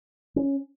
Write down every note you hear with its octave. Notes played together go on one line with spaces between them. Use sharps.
C#4